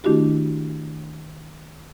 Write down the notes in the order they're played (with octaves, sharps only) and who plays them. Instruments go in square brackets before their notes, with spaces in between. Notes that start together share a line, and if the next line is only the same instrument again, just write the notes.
[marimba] D#3 A3 D4 E4 F#4 G4